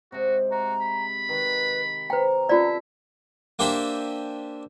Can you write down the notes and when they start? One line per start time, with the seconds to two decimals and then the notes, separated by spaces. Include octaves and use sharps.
0.12 C3 G#3 F#4
0.51 F#4 A#5
0.82 B5
1.29 D#3 B4
2.10 C4 B4 G5 A#5
2.49 C#4 F4 A4 D5 E5
3.59 A#3 D4 G4 C5 E5 G#5